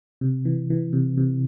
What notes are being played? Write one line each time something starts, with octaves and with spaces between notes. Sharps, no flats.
C3
E3
E3
C3
C3